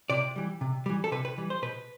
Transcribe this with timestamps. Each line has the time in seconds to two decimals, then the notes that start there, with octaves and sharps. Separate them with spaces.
0.10 C3 D5
0.36 E3 G3
0.61 C3
0.86 E3 G3
1.04 A4
1.11 C3 B4
1.25 B4
1.38 E3 G3
1.50 C5
1.62 B2 B4